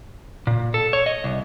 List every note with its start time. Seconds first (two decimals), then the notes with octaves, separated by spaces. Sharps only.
0.47 A#2
0.74 A4
0.93 C#5
1.06 D#5
1.24 C2